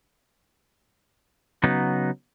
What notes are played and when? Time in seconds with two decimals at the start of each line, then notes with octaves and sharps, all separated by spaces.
1.63 C#3 F#3 B3 D#4